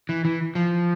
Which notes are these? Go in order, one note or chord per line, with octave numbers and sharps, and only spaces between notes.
E3
E3
F3